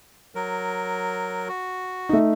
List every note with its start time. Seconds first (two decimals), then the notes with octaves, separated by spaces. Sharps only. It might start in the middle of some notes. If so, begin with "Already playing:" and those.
0.35 F#3 A#4
1.49 F#4
2.09 A3 D#4